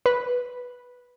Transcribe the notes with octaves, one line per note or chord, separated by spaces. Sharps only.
B4